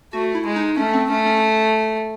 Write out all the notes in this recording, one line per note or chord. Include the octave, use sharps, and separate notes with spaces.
A3 F#4
E4
G#3
D#4
A3 C#4
C4
A3 C#4
C#4